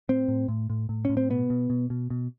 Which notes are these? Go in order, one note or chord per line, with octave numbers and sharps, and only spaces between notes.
A2 C4
A2
A2
A2
A2
A2 C#4
C4
B2 B3
B2
B2
B2
B2